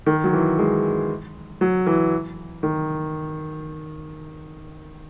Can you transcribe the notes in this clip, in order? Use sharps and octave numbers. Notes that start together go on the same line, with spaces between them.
D#3
F#3
E3
G#3
F#3
E3
D#3